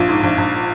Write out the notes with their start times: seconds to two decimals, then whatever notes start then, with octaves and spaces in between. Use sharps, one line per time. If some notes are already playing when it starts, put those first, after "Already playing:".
Already playing: A#1 F4
0.09 G#2
0.23 A#1
0.37 A#1